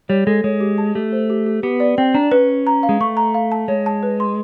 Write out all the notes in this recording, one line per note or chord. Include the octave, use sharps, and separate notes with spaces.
G3 C#5
G#3 A4
G#3 C#5
G4
A5
A3 G4
C5
G4
G4
B3 G4
D5
C4 G5
D4 A#5
C#4 B4
B4
A#5
F5
G#3
A3 C#6
A#5
F5
A5
G#3 C#5
A5
B4
C6